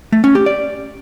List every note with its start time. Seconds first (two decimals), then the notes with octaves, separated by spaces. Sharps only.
0.12 A3
0.24 C#4
0.35 G4
0.46 D5